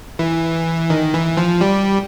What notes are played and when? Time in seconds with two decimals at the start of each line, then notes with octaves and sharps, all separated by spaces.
0.19 E3
0.90 D#3
1.14 E3
1.37 F3
1.61 G3